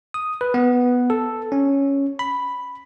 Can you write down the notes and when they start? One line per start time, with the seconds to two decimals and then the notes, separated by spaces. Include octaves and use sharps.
0.14 D#6
0.41 B4
0.54 B3
1.10 A4
1.52 C#4
2.19 B5